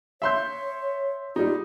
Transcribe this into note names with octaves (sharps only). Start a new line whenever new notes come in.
C#5 E5 C6 G6
G3 D#4 F4